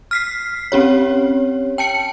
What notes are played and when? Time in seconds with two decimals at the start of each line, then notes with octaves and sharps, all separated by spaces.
0.11 F6 B6 C7
0.72 C4 C#4 G4 C#5
1.78 G5 A5 C#7